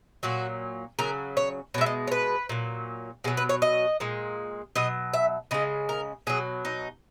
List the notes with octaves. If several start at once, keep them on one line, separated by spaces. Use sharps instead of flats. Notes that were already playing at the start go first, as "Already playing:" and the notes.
A#2 F#3 F#4
C#3 F#3 A#4
C#5
B2 G#3 C#5 E5
D#5
C#5
B4
A#2 F#3
B2 F#3 G#4
B4
C#5
D#5
A#2 G#3
B2 F#3 D#5
E5
C#3 G#3 D#5
A#4
B2 F#3 G#4
D#4